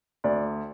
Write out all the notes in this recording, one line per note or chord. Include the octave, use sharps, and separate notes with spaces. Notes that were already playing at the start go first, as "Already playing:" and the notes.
D2 D5